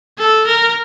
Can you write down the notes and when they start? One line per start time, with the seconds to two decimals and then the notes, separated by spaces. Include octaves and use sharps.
0.19 A4
0.47 A#4